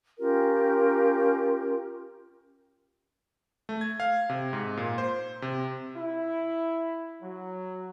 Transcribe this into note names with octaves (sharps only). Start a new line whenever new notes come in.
C#4 F4 G4 A#4
A3
G#6
F5
C3
G#2
A#2
C5
C3
E4
F#3